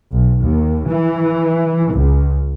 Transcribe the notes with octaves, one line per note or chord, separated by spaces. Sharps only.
B1
D#2
E3
C#2